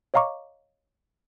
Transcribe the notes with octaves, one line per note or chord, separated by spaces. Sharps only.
C#5 D#5 F5 A#5 C#6 D6